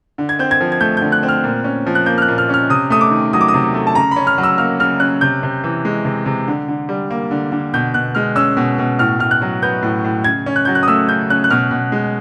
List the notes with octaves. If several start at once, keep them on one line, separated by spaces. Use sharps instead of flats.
D3
G#6
C4 G6
G#6
F3
G#6
A3 G6
D3 G6
F#6
C4
F6
A#2
C#4
F3
F#6
A#3 G6
F6
F#6
A#2
F6
C#4 F6
C3 D#6
A3 D#6
D6
D#3
F#3 D#6
D6
D#6
C3
A3
A5
C#3 A#5
B5
C#4
F6
F#3
E6
A#3 F6
C#3 F6
C#4 F#6
C3 G6
C3
E3
G#3
C3
C3
D3
D3
G3
A#3
D3
D3
B2 G6
B2 F#6
G#3 F6
C#4 E6
B2
B2
A2 F6
A2 F6
F#6
F#3
B3 G6
A2
A2
C#3 G#6
C#4
F#6
F#3 G6
F#6
D#6
A3 E6
C#3 G6
C#4 F#6
F#6
B2 F6
B2
G#3